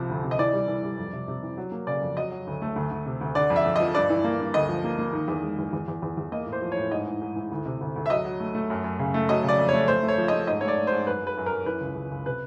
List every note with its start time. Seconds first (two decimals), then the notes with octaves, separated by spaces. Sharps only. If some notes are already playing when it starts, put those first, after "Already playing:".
Already playing: C2 C3 F3
0.09 D2
0.24 C3
0.31 D#5
0.39 E3 D5
0.53 G3
0.68 E3
0.83 G3
0.98 F2
1.13 C3
1.28 C3
1.43 E3
1.58 F#3
1.72 A#3
1.87 C#3 D5
2.02 F2
2.17 F#3 D#5
2.31 F#3
2.47 D2
2.62 A3
2.76 D2
2.91 D2
3.06 C3
3.21 D2
3.35 D3 D5
3.50 F2
3.56 E5
3.65 F2
3.76 F3 D#5
3.95 G2 D5
4.10 E3
4.24 A#3
4.40 G2
4.54 D2 D#5
4.69 F3
4.84 A#3
4.99 A#3
5.13 D#3
5.28 E2
5.43 G#3
5.58 E2
5.73 E2
5.88 E2
6.02 E2
6.17 E2
6.32 A#3 D#5
6.47 A2
6.52 C5
6.62 F3
6.72 A2 C#5
6.91 G#2 D#5
7.07 E3
7.21 G#2
7.36 E3
7.52 D2
7.66 C3
7.81 D2
7.96 D2
8.06 E5
8.10 F#3 D#5
8.25 F#3
8.40 A3
8.55 A3
8.70 F#2
8.84 F#2
8.99 C#3
9.14 A3
9.29 F#3 D#5
9.43 C#3
9.48 D5
9.58 F2
9.69 A3 C#5
9.88 A3 C5
10.03 A3
10.08 C#5
10.18 F3
10.28 A3 D#5
10.47 G#2 D#5
10.61 A3 C#5
10.68 D5
10.78 A3
10.87 G#2 C5
11.07 F#2 B4
11.22 F#2
11.27 B4
11.37 F#2
11.46 A#4
11.52 F#2
11.66 E3 B4
11.81 C#2
11.96 C#2
12.11 C#2
12.26 C3 B4